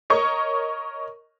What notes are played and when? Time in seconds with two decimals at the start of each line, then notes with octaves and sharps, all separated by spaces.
0.10 A#4 C#5 D#5 C#6